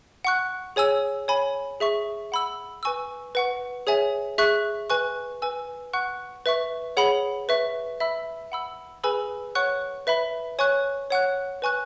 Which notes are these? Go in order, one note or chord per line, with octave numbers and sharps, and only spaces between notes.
F#5 C#6 F#6
G#4 C#5 G#5 E6
C#5 G#5 B5
G#4 E5 C#6
F#5 B5 E6
B4 G#5 C#6 E6
B4 F#5 C#6
G#4 C#5 E5 G#5
G#4 E5 C#6 F#6
B4 G#5 C#6 F#6
B4 G#5 E6
F#5 C#6 F#6
B4 E5 C#6
G#4 C#5 F#5 B5
B4 E5 C#6
E5 B5 E6
F#5 B5 E6
G#4 B4 G#5 B5 E6
C#5 F#5 C#6 F#6
B4 E5 B5
C#5 G#5 C#6 F#6
C#5 F#5 C#6 F#6
B4 G#5 C#6 F#6